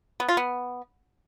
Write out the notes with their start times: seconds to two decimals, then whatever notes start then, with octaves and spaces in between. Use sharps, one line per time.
0.20 B3
0.29 F4
0.37 B3